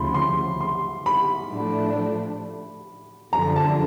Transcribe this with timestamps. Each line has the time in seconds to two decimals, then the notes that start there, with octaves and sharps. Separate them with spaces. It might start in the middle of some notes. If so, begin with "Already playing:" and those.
Already playing: D2 C#3 F3 B5 C6
0.14 C6
0.61 C6
1.06 B5
1.51 A2 F3 A3 D4
3.33 F#2 D3 F3 A#5
3.56 A5